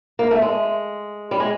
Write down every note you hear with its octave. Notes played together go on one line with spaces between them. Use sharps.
A#3
A3
G#3
G3
G#3